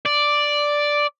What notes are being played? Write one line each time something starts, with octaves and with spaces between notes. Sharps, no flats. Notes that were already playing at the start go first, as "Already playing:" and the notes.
D5